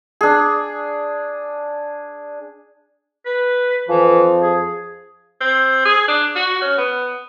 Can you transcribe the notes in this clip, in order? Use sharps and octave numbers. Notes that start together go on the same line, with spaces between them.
D4 G#4
B4
F2 E3 F3
G#4
C4
G#4
D4
F#4
C#4
B3